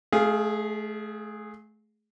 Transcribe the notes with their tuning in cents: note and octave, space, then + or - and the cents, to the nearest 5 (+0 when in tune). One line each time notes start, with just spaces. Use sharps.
A3 -35 G#4 +0 F5 +0